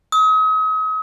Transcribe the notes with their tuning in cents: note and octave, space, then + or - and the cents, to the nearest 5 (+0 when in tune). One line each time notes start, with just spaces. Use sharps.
D#6 +40